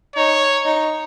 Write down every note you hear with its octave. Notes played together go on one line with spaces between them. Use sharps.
D#4 C#5
D#4